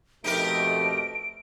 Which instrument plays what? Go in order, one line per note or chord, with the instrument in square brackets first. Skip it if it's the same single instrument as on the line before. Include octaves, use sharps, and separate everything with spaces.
[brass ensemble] F2 B2 A3 [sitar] D#4 G4 A#4 [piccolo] D7